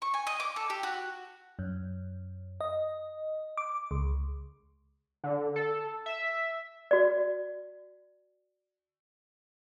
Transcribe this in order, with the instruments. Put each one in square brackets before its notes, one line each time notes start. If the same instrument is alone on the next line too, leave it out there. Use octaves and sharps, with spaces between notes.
[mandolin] C#6
G#5
D#5
D6
A4
G4
F#4
[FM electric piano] F#2
D#5
D6
C#2
[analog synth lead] D3
A4
E5
[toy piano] F#4 D5